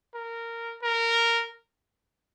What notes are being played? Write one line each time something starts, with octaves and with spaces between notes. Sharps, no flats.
A#4
A#4